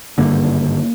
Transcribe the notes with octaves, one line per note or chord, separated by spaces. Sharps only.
G#1 G2 D3 A#3